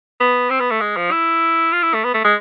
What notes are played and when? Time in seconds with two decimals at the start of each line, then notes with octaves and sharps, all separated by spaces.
0.20 B3
0.50 C4
0.60 B3
0.71 A3
0.81 G#3
0.97 F3
1.11 E4
1.73 F4
1.83 E4
1.94 A3
2.04 B3
2.14 A3
2.24 G#3